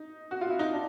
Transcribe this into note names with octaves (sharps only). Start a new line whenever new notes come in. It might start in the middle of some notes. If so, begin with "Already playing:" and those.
Already playing: D#4
F#4
F4
E4
D#4
D4